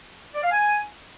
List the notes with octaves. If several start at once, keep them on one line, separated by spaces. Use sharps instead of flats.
D5
F5
G#5